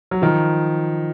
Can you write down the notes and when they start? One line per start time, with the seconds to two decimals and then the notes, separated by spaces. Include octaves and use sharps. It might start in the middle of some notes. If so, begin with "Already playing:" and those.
0.11 F#3
0.22 D#3 F3